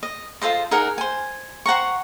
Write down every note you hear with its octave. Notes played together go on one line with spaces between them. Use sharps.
D#5
F4 A4 C5 D#5
D#4 G#4 A#4 F#5
C5 G#5
C5 F#5 A#5 C#6